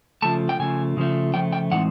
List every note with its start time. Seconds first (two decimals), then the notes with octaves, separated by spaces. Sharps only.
0.22 C#3 F3 A3 A5
0.49 G5
0.59 C#3 F3 A3 G#5
0.97 C#3 F3 A3
1.34 C#3 F3 A3 G5
1.52 G5
1.71 A2 E3 G#3 C4 D#4 F#5